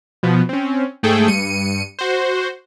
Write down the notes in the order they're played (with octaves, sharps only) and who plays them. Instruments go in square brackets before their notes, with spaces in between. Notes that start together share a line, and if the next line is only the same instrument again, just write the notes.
[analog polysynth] B2 F3 B3
C4 C#4
G#2 A3 G#4 A4 G5
G2 C#7 D#7
F#4 C5